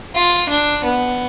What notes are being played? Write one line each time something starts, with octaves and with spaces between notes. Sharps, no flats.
F4
D4
B3